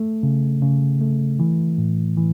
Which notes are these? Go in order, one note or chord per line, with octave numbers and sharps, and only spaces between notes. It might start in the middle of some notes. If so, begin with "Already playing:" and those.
Already playing: A3
C#3
C#3
A3
E3
A2
E3